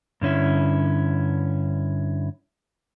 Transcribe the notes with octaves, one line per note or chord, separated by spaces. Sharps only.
G2 D3 C#4 E4